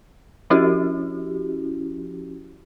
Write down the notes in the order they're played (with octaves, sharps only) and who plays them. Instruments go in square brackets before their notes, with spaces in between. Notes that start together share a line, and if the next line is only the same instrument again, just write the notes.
[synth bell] F3 C#4 E4 F#4 G4